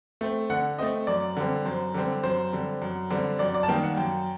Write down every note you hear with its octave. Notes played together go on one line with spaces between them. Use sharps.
A3 C4
D3 F#5
A3 C4 D#5
F#2 D5
D3 G3 C4
F#2 C5
D3 G3 C4
F#2 C5
D3 G3 C4
F#2
D3 G3 C4
F#2 D5
D5
A5
D#3 G3 A#3 G5
F#5
F#2 G5